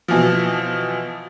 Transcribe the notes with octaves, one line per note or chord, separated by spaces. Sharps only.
B2 E3 F3